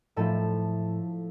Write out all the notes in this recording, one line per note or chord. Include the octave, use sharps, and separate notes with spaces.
A2 F3 A3 A4